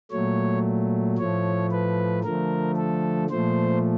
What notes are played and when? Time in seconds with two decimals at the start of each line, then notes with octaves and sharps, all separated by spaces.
0.11 A#2 F#3 A3 C#5
1.18 A2 F3 A3 C#5
1.71 B4
2.23 D3 F3 A3 A#4
2.77 A4
3.30 A#2 F3 A3 C5